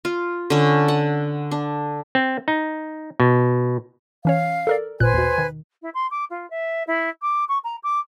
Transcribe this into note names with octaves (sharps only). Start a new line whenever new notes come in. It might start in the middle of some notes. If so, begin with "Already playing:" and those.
F4
D3 C#4
F#5
D4
C4
D#4
B2
E3 C#4 C#5 F5
A4 A#4 D5
G#1 A#2 B4 C5 G#5 F#6
D#2 B2
D#3
E4
C6
D6
F4
E5
E4
D6
C#6
A#5
D6